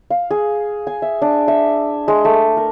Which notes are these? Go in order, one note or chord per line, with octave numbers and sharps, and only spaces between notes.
F5
G#4
G#5
E5
D4
E5
G#3
A3
A#4